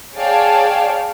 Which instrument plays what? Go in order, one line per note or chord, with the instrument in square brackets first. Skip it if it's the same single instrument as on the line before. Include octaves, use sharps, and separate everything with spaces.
[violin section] G#4 C#5 D5 F5 G5 A5